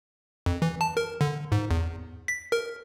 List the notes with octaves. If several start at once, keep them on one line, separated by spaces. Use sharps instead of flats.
F2
E3
A5
A#4
D3
G#2
E2
B6
A#4